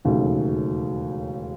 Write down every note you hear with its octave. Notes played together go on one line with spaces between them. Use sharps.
E1 D#2 C#3 F#3 A3